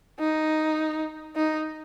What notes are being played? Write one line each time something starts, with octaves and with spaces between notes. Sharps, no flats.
D#4
D#4